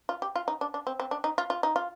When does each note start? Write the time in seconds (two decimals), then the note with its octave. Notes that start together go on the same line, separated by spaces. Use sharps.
0.09 F4
0.22 G4
0.35 F4
0.48 D#4
0.61 D4
0.74 D4
0.87 C4
1.00 C4
1.11 D4
1.24 D#4
1.38 F4
1.50 F4
1.63 D#4
1.76 F4